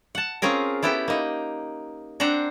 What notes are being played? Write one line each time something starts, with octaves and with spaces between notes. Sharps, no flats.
F#5 A5
C4 C#4 F4 G#4 A#4
B3 E4 G4 A4 G5
A#3 D#4
C4 D4 C5 F#5 A#5